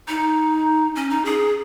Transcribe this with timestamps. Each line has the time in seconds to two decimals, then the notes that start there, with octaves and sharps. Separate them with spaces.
0.08 D#4
0.95 C#4
1.10 D#4
1.25 G#4